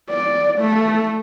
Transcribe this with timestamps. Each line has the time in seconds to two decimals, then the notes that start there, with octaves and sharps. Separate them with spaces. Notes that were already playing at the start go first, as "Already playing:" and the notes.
0.10 D5
0.58 A3